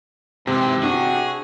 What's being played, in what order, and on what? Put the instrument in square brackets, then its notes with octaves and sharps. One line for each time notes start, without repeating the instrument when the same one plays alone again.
[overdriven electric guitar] G#2 E3 [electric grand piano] C3 [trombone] C4
[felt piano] D4 [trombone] F#4 [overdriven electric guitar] G#4